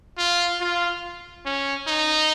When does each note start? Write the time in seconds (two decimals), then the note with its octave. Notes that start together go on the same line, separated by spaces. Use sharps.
0.18 F4
0.60 F4
1.46 C#4
1.88 D#4